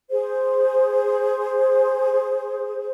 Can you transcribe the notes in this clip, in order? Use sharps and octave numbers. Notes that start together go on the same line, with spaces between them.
G#4 C5